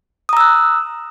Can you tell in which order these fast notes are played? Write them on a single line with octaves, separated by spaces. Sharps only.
D#6 A#5 E6 F#6